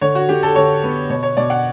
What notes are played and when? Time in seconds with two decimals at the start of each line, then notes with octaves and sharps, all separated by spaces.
0.01 D3 C#5
0.15 F#4
0.29 D3 G4
0.43 A4
0.55 D3 C#5
0.83 B3
1.10 B2 C#5
1.23 C#5
1.37 B2 D5
1.50 F#5